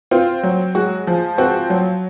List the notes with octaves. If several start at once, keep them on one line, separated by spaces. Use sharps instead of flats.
C4 F4
F#3
G#3 F#4
F3
C4 F#4
F#3